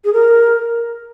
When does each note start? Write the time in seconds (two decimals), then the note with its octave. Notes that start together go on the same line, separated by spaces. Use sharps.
0.05 G#4
0.13 A#4